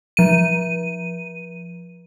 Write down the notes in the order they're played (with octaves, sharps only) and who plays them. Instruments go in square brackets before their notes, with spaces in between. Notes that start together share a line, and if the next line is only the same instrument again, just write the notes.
[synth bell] F3 D#7